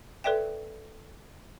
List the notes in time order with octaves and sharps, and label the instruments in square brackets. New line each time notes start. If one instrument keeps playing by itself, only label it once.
[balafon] A4 B4 D5 E5 G5